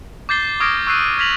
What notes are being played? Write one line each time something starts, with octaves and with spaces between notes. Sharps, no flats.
D6 G6 A6 C7 G7
C#6 D#6 F6 G#6 A#6 D7
C#6 E6 F#6 G#6 C7 D#7
F6 G#6 A#6 B6 F7 F#7